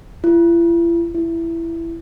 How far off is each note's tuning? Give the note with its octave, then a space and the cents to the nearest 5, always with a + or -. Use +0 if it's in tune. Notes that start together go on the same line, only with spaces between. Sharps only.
E4 +45
E4 +15